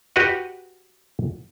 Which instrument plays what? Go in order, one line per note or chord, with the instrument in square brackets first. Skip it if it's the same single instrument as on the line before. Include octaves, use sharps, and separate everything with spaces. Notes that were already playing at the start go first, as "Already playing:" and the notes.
[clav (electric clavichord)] F#4 G4 B4 D#5 F#5